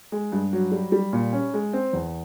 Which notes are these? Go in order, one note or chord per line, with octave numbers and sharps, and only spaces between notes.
G#3
G2
F#3
G3
G3
A#2
C#4
G#3
C4
E2